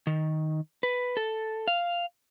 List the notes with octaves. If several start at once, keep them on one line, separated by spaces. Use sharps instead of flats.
D#3
B4
A4
F5